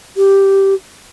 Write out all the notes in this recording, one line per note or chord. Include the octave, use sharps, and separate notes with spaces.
G4